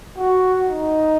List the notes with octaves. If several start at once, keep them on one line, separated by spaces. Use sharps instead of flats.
F#4
D#4